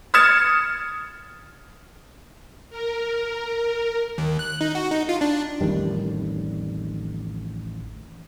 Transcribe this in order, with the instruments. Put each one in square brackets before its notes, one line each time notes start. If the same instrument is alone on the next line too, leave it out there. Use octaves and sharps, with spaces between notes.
[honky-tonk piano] D#6 F6 G#6 A6 C#7 E7
[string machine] A#4
[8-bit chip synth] D#2
F#6
D#4
F#4
D#4
F4
D4
[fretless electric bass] A1 F2 D#3 G3